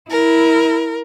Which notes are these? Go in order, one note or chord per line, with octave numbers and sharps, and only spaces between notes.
E4 A#4